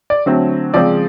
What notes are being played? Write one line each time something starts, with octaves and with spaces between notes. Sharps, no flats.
D5
D3 F#3 A3 C4
C#3 F3 G#3 C4 D5